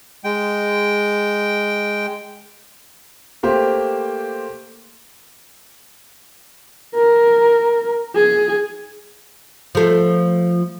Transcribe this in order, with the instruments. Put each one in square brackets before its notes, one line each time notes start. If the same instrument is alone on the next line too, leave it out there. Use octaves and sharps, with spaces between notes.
[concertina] G#3 G5
[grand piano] A3 A#3 G4 C5
[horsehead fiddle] A#4
G#4
[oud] F3 A3